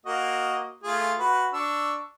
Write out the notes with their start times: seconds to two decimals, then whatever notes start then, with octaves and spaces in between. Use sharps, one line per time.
0.06 A#3 F#4 D#5
0.83 A3 F4 G#4
1.19 F#4 B4
1.53 D4 C#6 E6